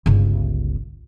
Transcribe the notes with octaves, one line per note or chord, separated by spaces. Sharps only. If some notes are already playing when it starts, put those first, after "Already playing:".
G1 C#2